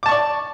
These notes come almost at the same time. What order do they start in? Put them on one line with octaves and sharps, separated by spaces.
D6 A5 C#6 D5